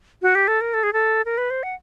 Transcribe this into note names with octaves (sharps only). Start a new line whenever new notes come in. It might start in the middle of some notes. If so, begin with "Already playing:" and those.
F#4
G4
A4
A#4
A4
G#4
A4
A#4
B4
C5
F#5